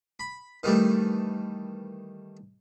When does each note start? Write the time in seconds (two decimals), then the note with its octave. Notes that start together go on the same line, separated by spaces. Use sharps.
0.20 B5
0.63 D#3 E3 G3 A3